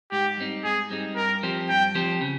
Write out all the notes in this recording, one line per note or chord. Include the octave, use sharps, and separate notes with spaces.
G#2 G4
G3 C4 D#4
G#2 G#4
G3 C4 D#4
G2 A#4
F3 C4 G4 C5
G2 G5
F3 C4 G4 C5
C#3